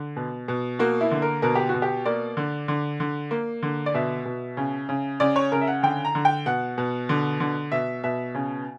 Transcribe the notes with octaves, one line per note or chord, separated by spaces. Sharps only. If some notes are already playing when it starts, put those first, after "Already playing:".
Already playing: D3
B2
B2
A#3 F#4
E4
D3
A#4
B2 A#4
G4
F#4
B2
G4
A#3 D5
D3
D3
D3
A#3
D3
D5
B2 E5
B2
C#3
C#3
C#3 D5
C#5
C#3 A#4
E5
F#5
D3 G5
A#5
D3
G5
B2 F#5
B2
D3
D3
B2 E5
B2 E5
C#3